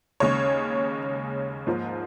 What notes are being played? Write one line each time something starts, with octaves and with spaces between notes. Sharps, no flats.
D#2 C#3 G#3 C#4 C#5
G#2 F3 A#3